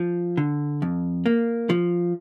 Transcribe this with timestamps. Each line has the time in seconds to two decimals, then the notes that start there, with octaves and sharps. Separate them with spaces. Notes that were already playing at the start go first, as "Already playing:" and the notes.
Already playing: F3
0.37 D3
0.82 F2
1.26 A#3
1.70 F3